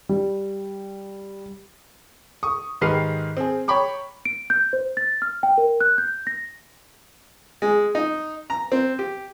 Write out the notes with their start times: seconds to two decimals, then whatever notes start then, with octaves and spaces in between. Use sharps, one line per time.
0.09 G3
2.43 C#6 D#6
2.81 G#2 D#3 G4 B4 F6 C7
3.37 C4 G#4
3.68 C#5 G5 A#5 B5 C#6 D6
4.25 D7
4.50 G6
4.73 C5
4.97 A6
5.22 F6
5.43 G5
5.58 A#4
5.81 F#6
5.98 G6
6.27 A#6
7.62 G#3
7.95 D#4
8.50 A#5
8.72 C4
8.99 G4